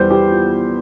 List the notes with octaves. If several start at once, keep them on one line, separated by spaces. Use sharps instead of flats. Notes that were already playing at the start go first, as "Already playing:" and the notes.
Already playing: E2 E3 G3 G4 C5
G4
F4